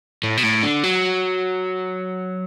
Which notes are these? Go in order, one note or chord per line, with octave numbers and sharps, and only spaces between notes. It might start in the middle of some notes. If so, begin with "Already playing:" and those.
A2
B2
A2
D3
F#3